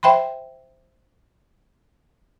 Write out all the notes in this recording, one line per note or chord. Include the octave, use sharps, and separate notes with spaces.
C5 E5 G5 B5 C6